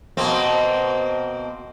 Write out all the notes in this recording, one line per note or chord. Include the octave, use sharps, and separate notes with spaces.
B2 A#3 C4